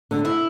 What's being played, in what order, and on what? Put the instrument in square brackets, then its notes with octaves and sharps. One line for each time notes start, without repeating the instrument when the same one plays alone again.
[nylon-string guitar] D3
[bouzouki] E4